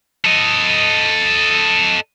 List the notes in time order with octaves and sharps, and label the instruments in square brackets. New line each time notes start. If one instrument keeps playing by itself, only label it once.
[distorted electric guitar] A4 D#5